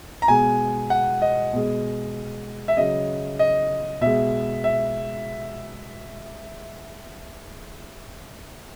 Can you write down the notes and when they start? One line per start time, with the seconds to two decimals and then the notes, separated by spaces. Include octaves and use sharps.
0.22 A#5
0.28 B2 G#3 G#5
0.90 F#5
1.22 D#5
1.53 B2 G#3
2.68 E5
2.77 C#3 F#3 D#5
3.39 D#5
4.01 B2 G#3 E5
4.64 E5